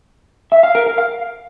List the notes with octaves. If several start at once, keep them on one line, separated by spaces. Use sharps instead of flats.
E5
F5
A#4
A#4
F5